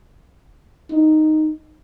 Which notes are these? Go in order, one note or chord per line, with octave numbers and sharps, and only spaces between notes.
D#4